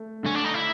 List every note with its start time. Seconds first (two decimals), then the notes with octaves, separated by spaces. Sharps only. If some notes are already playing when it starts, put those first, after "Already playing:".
Already playing: A3
0.23 D3 C#4
0.35 D4
0.45 D#4
0.54 E4